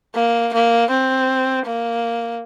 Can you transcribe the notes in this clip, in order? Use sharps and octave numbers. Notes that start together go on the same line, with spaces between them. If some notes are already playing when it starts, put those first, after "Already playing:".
A#3
A#3
C4
A#3